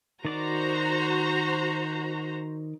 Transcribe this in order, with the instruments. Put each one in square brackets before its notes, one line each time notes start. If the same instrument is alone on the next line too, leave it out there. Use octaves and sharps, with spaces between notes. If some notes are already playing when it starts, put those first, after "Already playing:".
[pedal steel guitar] D#3 D5 D6 [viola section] F#4 C5 A#5